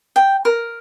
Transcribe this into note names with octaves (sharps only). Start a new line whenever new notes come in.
G5
A#4